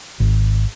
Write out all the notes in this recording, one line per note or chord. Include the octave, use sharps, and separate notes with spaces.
G#1